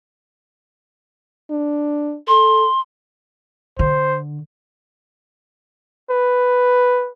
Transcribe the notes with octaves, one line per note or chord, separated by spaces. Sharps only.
D4
A4 C6
D3 C5
B4